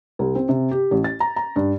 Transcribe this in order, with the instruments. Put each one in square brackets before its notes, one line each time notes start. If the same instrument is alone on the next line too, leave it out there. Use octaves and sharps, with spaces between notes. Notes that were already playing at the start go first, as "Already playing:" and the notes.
[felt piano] C2
C4
C3
G4
A1
A6
A#5
A#5
G2